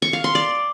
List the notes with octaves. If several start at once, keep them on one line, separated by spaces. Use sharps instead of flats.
C#6
F5
C6
D5